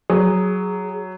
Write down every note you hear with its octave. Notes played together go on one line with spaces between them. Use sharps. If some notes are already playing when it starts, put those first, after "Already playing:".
F#3 G#4